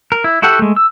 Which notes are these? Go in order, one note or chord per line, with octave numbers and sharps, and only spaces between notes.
A#4
E4
E4 F#4 G4 A4 F#5
G#3 A3
E6